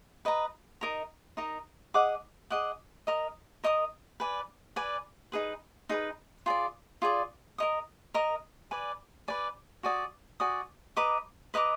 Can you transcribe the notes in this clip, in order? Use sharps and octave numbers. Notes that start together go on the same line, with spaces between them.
B4 D#5 A#5
D#4 A#4 D#5 A#5
D#4 A#4 D#5 A#5
G#4 D#5 F#5 D6
G#4 D#5 F#5 D6
A#4 D#5 A#5 D#6
A#4 D#5 A#5 D#6
B4 D5 G#5
B4 D5 G#5
D#4 G#4 B4
D#4 G#4 B4
F4 G#4 D5
F4 G#4 D5
A#4 D#5 A#5 D#6
A#4 D#5 A#5 D#6
B4 D5 G#5
B4 D5 G#5
F#4 D5 G#5 D#6
F#4 D5 G#5 D#6
B4 D#5 A#5 D6
B4 D#5 A#5 D6